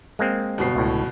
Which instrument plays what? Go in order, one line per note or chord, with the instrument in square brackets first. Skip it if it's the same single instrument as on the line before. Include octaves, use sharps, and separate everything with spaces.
[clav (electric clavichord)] G#3 A#3 C4
[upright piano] G1 B2 C7
[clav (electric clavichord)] C#2 A2